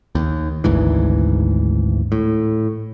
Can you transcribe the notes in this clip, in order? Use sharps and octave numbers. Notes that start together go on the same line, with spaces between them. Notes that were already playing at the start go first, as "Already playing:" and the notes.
D#2
G#1 D2 G#2 E3
A2